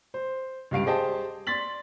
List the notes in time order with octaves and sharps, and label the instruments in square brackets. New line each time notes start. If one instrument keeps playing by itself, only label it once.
[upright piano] C5
C#2 G2 F5 D7
G4 G#4 C5 D#5 G5 A5
D5 C6 A6 B6 F#7